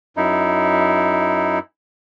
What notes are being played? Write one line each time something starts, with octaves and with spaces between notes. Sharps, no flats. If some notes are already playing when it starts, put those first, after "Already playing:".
F#2 D#4 E4